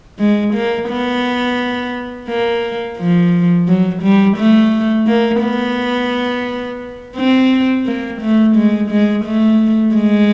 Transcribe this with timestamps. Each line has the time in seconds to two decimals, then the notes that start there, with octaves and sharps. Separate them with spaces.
0.19 G#3
0.54 A#3
0.89 B3
2.28 A#3
2.98 F3
3.68 F#3
4.03 G3
4.37 A3
5.07 A#3
5.42 B3
7.16 C4
7.86 A#3
8.21 A3
8.56 G#3
8.91 G#3
9.25 A3
9.95 G#3